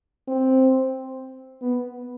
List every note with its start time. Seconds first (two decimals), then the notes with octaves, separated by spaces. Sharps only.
0.28 C4
1.62 B3